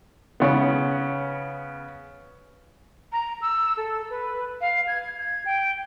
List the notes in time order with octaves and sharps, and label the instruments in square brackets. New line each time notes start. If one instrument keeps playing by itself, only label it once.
[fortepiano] C#3 B3
[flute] A#5
E6
A4
B4
F5
G#6
G#6
G5